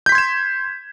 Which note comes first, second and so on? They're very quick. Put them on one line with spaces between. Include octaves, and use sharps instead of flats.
G6 B6 C6 G#6 E7